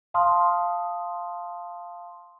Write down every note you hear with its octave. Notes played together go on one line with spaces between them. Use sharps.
F5 A5 C6 D#6 F6